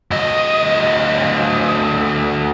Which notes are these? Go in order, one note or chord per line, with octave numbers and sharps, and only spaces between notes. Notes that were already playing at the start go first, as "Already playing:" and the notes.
D2 D#5